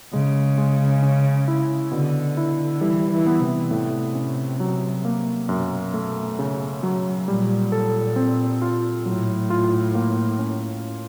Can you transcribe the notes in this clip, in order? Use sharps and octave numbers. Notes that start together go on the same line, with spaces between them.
C#3 G#3
G#3
C#4
E4
B2 D3
E4
E3 G3
E3
B3
C3
A2
C#4
F#3
A#3
F#2 B2
A3
C#3
F#3
A#2 G3
A4
C4
F4
A2 F#3
F4
A#3
C#4